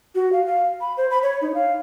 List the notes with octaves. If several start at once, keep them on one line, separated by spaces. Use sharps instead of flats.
F#4
F5
F5
B5
C5
B5
C#5
D#4
F5